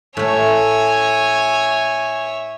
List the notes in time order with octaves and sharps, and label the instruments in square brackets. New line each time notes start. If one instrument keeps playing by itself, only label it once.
[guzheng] A2 A3 [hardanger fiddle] C#5 E5 [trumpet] G#5